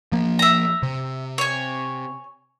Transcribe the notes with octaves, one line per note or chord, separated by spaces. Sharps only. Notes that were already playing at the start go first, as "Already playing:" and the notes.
F3 A#3
E5 A#5
C3
C#5 G#5